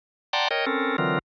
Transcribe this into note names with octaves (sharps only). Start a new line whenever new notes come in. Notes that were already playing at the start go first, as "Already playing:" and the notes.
D5 F#5 G5 A5 A#5 C6
A#4 C#5 D#5 G5
C4 C#4 A4 A#4
D3 E3 F#3 C4 F4 A#4